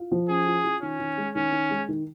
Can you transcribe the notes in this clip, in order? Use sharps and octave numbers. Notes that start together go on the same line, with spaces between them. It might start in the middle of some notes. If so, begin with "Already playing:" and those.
Already playing: F4
F3
C#4 G#4
F4
F4
D#3 C#4
D#3
G#3
D#3 C#4
D#3
G#3
D#3